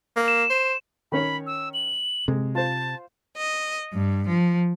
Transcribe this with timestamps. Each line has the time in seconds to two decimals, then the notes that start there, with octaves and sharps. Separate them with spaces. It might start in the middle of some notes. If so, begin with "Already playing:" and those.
0.16 A#3
0.28 E7
0.50 C5
1.12 D#3 C#4 C#5 B5
1.47 E6
1.74 F#7
2.28 C3 G#3
2.55 F4 C5 A5
3.37 D#5
3.93 G2
4.27 F3